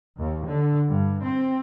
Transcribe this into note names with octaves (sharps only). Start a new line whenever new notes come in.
D#2
D3
G2
C4